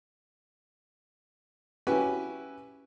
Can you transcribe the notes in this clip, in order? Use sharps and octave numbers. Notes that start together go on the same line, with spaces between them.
C#4 E4 F#4 G4 B4 G#5